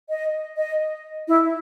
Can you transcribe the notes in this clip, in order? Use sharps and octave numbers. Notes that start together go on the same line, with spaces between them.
D#5
D#5
E4